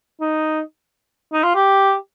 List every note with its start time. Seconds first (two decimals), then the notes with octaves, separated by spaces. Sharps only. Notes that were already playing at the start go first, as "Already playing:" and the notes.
0.21 D#4
1.33 D#4
1.44 F4
1.55 G4